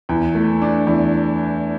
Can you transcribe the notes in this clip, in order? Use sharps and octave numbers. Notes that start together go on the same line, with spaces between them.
E2
A3
D4
E2